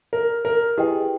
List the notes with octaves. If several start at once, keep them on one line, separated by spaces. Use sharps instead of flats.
A#4
A#4
E4 G4 G#4 B4 D#5 G5